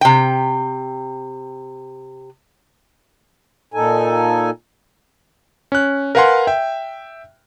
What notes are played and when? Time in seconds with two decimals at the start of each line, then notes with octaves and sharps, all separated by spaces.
0.01 C3 G5
3.74 A#2 D#4 A4 G#5
5.72 C#4 F#6
6.15 A#4 B4 F5 F#5 G#5 C6
6.47 E5 G5